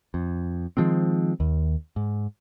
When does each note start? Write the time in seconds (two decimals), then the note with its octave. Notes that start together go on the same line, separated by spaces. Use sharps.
0.14 F2
0.77 D#3 F3 G#3 C4
1.40 D#2
1.96 G#2